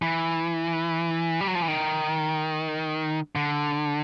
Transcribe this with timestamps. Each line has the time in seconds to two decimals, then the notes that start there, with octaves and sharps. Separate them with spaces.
0.02 E3
1.41 G3
1.48 F#3
1.55 F3
1.62 E3
1.68 D#3
3.36 D3